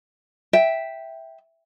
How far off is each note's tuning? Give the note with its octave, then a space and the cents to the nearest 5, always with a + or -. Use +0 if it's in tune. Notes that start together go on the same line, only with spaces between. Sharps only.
E5 -5 G5 +0